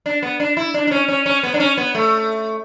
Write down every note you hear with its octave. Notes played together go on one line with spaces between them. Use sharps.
D4
B3
D4
E4
D4
D4
C#4
C#4
C#4
B3
D4
C#4
B3
A3